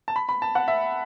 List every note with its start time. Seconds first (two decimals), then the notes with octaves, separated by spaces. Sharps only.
0.08 A5
0.16 B5
0.29 B5
0.42 A5
0.55 F#5
0.68 E5